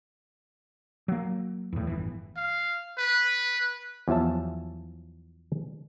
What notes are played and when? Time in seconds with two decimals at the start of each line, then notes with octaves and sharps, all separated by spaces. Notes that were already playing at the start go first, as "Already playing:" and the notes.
1.08 F#3 A#3
1.73 E2 A2
1.87 G1 C2 E3
2.37 F5
2.98 B4
4.08 E2 F3 F#3 E5 A5